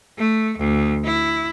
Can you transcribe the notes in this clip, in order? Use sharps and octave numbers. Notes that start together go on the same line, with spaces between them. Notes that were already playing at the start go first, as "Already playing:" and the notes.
A3
D2
E4